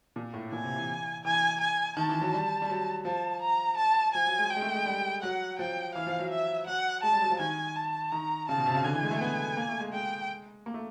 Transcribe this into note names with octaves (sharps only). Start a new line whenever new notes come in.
A#2
A2
A#2 G#5
C3
E3
E3
E3 G#5
G#5
D#3 A5
E3
F#3
G3
G3
F#3
F3 A5
A#5
A5
F3 G#5
F#3
G#3
G5
G#3
A3
G#3
G3
F#3 F#5
F3 G5
E3 F5
F3
F#3
E5
F#3 F#5
G#3 A5
G3
F#3
F3
D#3 G#5
A5
D#3 A#5
C#3 A5
B2
C3
C#3
D3 G#5
E3
G#3
A3
B3
A#3
A3
G#3
G#3 G5
A#3
A3